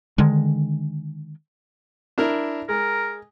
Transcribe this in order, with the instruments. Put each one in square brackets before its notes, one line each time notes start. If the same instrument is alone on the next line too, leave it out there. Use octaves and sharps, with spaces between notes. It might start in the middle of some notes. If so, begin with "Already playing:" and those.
[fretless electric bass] D3 D#3 G#3
[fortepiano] D4 E4 A#4
[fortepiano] G#3 [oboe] A#4